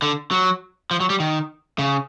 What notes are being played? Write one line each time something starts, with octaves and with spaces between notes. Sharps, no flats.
D3
F#3
F3
F#3
G3
D#3
C#3